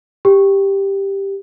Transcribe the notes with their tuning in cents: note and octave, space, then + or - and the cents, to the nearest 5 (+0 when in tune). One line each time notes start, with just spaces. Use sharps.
G4 +5